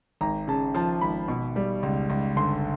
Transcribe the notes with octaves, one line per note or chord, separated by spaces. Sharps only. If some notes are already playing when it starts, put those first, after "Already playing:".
G#1 A#5
C#3 A5
F3 A5
G#1 B5
B2
G3
C#2
C#2
G1 C6